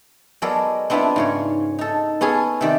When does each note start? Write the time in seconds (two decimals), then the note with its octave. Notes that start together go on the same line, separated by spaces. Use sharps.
0.42 F#3 G#3 B3 A4 A#4 D5
0.90 B3 C4 D4 E4 F4 B4
1.16 G#2 C#3 C#5
1.79 D#4 A4
2.21 B3 C#4 G#4 A4
2.61 C3 D#3 D5